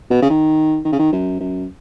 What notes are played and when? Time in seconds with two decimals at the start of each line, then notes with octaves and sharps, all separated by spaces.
0.10 B2
0.22 C#3
0.30 D#3
0.85 D#3
0.92 C#3
0.99 D#3
1.12 F#2
1.40 F#2